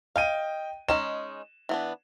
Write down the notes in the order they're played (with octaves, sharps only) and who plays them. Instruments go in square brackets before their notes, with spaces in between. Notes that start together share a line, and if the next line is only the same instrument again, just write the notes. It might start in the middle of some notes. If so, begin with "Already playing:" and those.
[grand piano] D#5 G5 D#7 [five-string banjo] F5
[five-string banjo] G#3 C#4 D#4 [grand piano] E7
[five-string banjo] E3 B3 D4